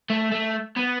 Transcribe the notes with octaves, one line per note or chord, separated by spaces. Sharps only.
A3
A3
B3